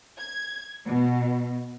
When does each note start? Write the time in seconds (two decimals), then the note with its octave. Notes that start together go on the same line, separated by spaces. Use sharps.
0.17 G#6
0.85 B2